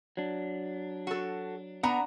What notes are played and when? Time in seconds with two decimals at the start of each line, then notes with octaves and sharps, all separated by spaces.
0.17 F#3 D4
1.07 F#4 A4
1.83 B3 D4 F#5 A#5